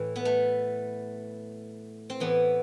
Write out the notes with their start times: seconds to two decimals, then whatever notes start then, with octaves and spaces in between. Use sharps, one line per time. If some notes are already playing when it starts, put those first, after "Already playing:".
Already playing: A2 E3
0.16 B3
0.25 A3
2.10 C4
2.20 A2 E3 B3